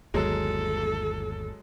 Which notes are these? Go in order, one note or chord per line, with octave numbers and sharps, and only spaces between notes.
G1 D#2 F#3 G#3 A4